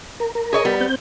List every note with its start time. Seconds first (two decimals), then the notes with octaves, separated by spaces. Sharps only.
0.20 A#4
0.35 A#4
0.53 G#4 C#5 D#5
0.65 G3 B3
0.80 C4 G6